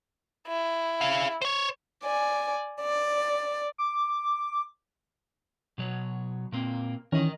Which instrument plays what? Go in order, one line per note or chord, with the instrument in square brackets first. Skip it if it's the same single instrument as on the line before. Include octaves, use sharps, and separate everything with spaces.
[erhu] E4
[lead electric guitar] G#4 F5
C5 C#5
[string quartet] D5 G#5
D5
[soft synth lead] D6
[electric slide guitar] B2 F#3 C#5
A#2 A#3 C4
[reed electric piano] D#3 E3 C#4 [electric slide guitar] A#4 D#5